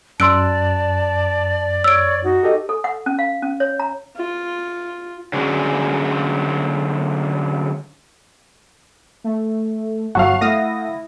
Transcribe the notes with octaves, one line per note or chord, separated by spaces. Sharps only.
F#2 D5 A5 C6 E6 F#6 D7
C#5 E6 D7
D#4 F#4
G4 A4 D#5
A4
F#5
C#4
F5
C#4
C#5
A#5
F4
D3 F#3 G#3 C#4
A3
G1 F#3 F5 F#5 A5 C#6
A3 E4 F5 D#6 A#6